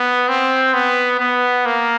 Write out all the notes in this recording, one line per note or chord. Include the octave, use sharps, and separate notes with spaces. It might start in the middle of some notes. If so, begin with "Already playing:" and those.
Already playing: B3
C4
B3
B3
A#3